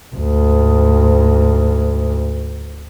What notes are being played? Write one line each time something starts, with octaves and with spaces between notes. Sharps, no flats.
D2 G#2